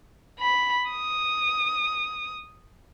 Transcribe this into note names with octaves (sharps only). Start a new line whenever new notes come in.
B5
D#6